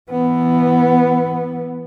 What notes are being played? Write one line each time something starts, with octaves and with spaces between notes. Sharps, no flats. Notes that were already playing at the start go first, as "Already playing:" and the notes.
E3 B3